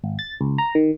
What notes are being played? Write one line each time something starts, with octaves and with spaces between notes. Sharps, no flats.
G#1
A6
C#2
A#5
D#3